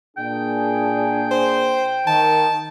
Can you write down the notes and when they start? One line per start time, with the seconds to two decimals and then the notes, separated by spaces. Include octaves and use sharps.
0.17 A#2 D4 G#4 G5
1.31 C5
2.07 D#3 A5